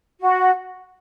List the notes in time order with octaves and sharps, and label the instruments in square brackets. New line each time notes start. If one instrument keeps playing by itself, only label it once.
[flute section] F#4